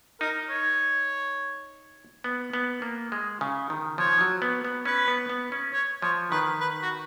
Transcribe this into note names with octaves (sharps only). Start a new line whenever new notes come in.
D#4 A#4
C#5
B3
B3
A#3
G#3
C#3
D#3
F3 C#5
F#3
B3
B3
C#4 B4
B3
B3
C#4
C#5
F3 C#5
D#3 B4
B4
F#4